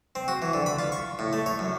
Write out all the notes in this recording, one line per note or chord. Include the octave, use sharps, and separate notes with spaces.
C4
F#4
E3
D3
B5
F4
C#6
A2
A3
C#5
F#2